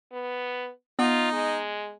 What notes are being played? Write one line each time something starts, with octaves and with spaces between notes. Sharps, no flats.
B3
B3 D#4 F4
G#3